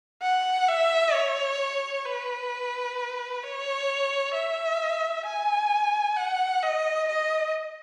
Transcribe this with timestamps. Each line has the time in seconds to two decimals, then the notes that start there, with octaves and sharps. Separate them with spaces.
0.22 F#5
0.69 E5
1.14 C#5
2.06 B4
3.43 C#5
4.34 E5
5.26 G#5
6.17 F#5
6.63 D#5
7.09 D#5